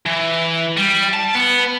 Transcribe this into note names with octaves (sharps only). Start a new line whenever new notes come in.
E3
G3
A5
B3